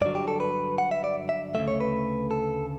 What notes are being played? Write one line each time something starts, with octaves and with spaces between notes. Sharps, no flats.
G2 D3 F#3 D5
G4
A4
B4
F#5
E5
D5
E5
D2 C#3 E3 A3 E5
C#5
B4
A4